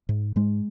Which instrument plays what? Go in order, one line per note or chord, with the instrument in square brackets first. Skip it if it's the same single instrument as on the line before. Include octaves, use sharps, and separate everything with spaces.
[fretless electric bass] G#2
G#2 G#3